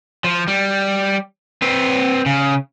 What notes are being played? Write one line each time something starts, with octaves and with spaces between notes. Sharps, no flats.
F3
G3
C4 B4
C#3